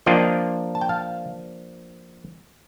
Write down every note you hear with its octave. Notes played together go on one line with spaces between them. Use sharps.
F3 A#3 D4 F4 D#5 G5
A5
G5
F5 A5